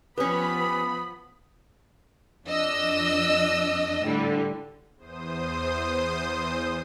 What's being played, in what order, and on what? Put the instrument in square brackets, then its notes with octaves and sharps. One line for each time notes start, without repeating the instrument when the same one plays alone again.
[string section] F3 B3 B5 [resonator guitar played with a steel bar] C#4 G4 [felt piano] B4 [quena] D#6
[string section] F2 D4 D#5 E6
A2 D3 G3
[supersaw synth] E2 C5 D#6